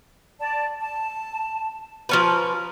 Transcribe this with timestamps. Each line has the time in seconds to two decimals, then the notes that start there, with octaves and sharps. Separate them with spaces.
0.40 D5 A5
0.80 A5
2.09 F3 C#4 B4 A#5